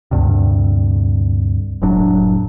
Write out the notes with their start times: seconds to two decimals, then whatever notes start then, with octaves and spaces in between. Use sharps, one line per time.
0.11 D2 G2 C3
1.82 F1 A2 F#3 D4